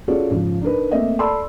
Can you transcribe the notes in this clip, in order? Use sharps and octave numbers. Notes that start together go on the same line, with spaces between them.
C#4 F4 F#4 G#4 A4 D5
G#2 C#3 F3
D4 D#4 A#4 B4
A3 A#3 C4 A4 D#5 E5
A4 D5 A5 B5 C6 E6